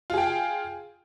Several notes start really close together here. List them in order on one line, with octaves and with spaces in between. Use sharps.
F4 G#4 G5